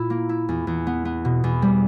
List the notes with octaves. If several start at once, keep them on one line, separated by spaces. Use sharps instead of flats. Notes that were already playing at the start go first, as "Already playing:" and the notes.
Already playing: A#2 E4
A#3
E4
E2
E2
B3
B3
B2
E2
G3